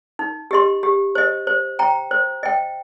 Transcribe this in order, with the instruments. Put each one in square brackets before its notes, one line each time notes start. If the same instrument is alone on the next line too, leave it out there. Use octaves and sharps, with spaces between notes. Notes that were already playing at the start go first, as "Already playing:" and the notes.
[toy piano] D#4
G4 D#5 C6
G4
C5 D#5
C5
G5 A#5
C5
D#5 G5